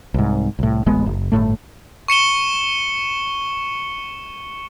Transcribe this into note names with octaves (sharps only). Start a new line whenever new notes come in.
C2 G#2
C2 A2
D1 A1 G#3 B3
F#1
G1 C#2 A2 A3
C#6 C#7 E7 G7